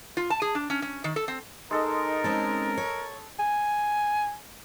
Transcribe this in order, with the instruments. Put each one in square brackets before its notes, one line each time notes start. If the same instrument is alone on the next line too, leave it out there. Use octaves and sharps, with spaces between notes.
[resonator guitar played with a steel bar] F4
A5
G#4
D4
C#4
C#4
D#3
A4
C4
[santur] G#3 A4 D#5 [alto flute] D#4 [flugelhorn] A#4
[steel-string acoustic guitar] G#3 C4 C#4 [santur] A5
[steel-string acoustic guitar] C#5
[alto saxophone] G#5